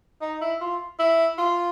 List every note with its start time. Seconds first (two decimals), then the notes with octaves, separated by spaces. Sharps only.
0.22 D#4
0.41 E4
0.61 F4
0.99 E4
1.38 F4